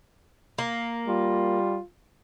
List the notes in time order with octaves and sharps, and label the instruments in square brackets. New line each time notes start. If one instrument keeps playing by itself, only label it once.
[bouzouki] A#3
[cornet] G3 [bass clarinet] F4